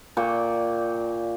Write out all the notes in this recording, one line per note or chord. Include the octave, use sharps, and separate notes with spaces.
A#2 D5 G5 C#6